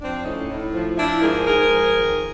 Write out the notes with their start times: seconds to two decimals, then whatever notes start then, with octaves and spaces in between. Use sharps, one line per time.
0.01 F3 C4 D4
0.25 A2 C#4 D#4
0.49 A2
0.74 F3
0.98 F3 D4 E4
1.22 G#2 G#4 A#4
1.46 G#2 G#4 A#4
1.71 F3
1.95 D#3